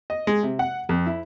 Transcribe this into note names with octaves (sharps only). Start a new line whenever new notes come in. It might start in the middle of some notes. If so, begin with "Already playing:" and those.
D#5
G#3
C3
F#5
F2
E4